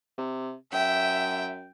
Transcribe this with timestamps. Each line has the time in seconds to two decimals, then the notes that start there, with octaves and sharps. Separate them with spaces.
0.18 C3
0.73 F#2 E5 G5